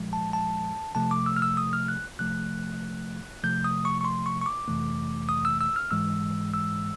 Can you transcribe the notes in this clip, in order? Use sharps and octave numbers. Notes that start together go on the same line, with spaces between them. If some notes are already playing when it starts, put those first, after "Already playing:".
Already playing: A#2 F3 G#3
A5
A5
C3 F3 A3 A5
D6
E6
F6
E6
D#6
F6
F#6
C3 F3 A3 F#6
C3 F3 A3 G6
D#6
C#6
C#6
C6
C#6
C#6
D6
F2 C3 E3 A3
D#6
E6
E6
F6
G#2 E3 G#3 E6
E6